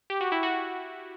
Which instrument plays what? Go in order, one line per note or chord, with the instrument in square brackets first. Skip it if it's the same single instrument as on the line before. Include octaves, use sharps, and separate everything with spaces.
[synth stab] G4
F#4
E4
F#4